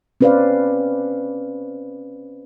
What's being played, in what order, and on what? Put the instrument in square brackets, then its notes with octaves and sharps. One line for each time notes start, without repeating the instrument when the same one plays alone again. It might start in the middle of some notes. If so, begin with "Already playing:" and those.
[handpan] C4 C#4 B4 C5 D5 F5